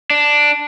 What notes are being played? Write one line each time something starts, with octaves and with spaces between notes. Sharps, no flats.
D4